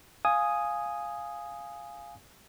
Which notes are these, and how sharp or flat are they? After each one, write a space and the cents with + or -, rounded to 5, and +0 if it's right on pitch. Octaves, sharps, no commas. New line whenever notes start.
F5 +0 G#5 +0 D#6 +0